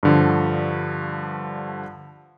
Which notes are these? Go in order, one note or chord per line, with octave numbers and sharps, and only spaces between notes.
G2 D3 F3